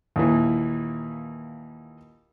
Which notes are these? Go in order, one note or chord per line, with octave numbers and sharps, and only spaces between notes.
D#2 A#2 E3